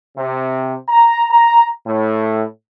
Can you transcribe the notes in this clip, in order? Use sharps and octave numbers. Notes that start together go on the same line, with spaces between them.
C3
A#5
A#5
A2